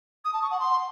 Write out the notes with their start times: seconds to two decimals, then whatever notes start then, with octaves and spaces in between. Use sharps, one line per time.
0.25 D#6
0.33 A5
0.42 C#6
0.51 F#5
0.60 C6